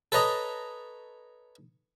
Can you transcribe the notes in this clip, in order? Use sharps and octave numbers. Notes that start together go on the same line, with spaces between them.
A4 B4 C#5 D#5 A#5